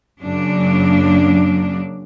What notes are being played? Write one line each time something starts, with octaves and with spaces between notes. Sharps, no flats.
F#2 C#3 F#3 A#3 D4